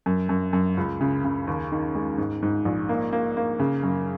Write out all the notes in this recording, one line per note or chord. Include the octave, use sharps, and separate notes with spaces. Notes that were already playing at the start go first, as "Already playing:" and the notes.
F#2
F#2
F#2
C#2
C#3
C#3
D#2
D#3
G#3
G#2
G#2
A#1
A#3
A#3
A#3
C#3
F#2